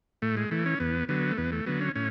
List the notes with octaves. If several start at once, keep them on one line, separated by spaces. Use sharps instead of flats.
A2 A3
G#3
E3 A3
C#4
E2 B3
D3 F#3 B3
A3
E2 B3
A3
D3 F#3 B3
C#4
A2 C#4